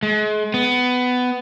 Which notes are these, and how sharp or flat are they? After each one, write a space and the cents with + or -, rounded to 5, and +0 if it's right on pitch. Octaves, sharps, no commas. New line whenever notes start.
G#3 +35
B3 +15